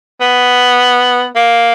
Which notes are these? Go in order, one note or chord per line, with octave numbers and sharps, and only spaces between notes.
B3
A#3